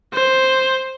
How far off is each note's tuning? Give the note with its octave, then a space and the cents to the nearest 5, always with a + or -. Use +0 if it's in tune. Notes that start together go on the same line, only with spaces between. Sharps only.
C5 +5